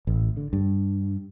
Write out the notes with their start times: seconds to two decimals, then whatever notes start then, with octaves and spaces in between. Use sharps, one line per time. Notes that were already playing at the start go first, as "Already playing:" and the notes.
0.07 A1
0.37 D3
0.53 G2